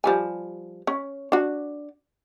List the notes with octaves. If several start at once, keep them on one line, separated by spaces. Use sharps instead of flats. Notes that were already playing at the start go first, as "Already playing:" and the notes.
F3 G3 G#5
C#4
D4 F#4